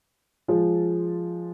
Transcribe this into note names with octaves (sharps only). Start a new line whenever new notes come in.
F3 G#3 F4